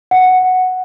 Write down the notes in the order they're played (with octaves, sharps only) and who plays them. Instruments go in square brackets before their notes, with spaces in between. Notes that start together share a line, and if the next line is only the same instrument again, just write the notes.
[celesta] F#5